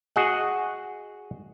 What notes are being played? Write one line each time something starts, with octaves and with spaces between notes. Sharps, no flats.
F#4 G#4 D#5 F#5